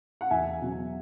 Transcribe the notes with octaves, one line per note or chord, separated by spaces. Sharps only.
F#5
E2 E5 G#5
B2 F#3